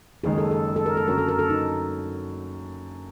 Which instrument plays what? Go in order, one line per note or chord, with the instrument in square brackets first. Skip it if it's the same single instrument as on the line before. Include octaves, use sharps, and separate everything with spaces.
[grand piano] F#1 F#2 D#3 G#3 [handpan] G#4
[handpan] A4
A4
A4
A#4
A4
[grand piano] F#2 D3 F#3 [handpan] A#4
[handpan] A4
A#4
A4
D#4